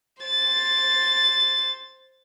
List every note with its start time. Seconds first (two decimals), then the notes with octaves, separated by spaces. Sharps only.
0.23 C5 A6